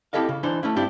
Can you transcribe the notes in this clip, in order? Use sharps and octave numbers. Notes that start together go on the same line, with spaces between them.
C4 E4 G4 A4 D#5 F5
C#3
E3 D4 D#4 C5
A3 C#4 E4
G2 C4 D4 E4 G4